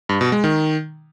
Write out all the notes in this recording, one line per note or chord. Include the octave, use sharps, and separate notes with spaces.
G2
B2
G#3
D#3